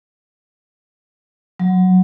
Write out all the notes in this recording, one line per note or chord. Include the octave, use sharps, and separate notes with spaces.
F#3